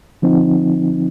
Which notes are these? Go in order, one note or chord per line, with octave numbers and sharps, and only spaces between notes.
D3 F3 C4 D#4